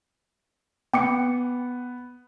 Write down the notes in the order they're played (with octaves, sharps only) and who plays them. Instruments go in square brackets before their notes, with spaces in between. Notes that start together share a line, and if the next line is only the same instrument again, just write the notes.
[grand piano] B3 [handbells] G5 D6 C#7